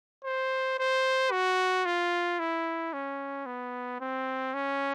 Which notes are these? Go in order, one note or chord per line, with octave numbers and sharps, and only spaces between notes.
C5
C5
F#4
F4
E4
C#4
B3
C4
C#4